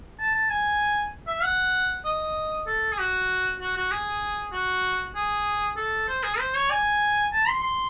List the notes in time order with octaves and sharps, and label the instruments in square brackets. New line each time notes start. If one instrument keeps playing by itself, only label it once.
[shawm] A5
A5
G#5
E5
F#5
D#5
A4
G#4
F#4
F#4
F#4
G#4
F#4
G#4
A4
C5
G#4
C5
C#5
G#5
A5
C6
C6